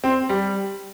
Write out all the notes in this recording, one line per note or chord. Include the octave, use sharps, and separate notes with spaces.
C4
G3